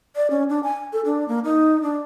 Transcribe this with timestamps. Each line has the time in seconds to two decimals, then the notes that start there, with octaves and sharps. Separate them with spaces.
0.16 D5
0.30 C#4
0.50 D4
0.64 G#5
0.93 A4
1.05 D4
1.28 A#3
1.44 D#4
1.82 D4